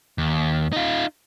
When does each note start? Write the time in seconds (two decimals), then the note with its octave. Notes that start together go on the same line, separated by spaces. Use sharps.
0.18 D#2
0.73 D#4 F4